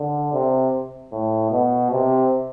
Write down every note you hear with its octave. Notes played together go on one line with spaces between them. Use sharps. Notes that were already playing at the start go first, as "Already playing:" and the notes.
Already playing: D3
C3
A2
B2
C3